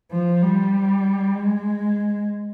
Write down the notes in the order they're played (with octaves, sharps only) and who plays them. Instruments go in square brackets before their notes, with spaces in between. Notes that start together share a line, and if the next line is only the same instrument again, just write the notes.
[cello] F3
G3
G#3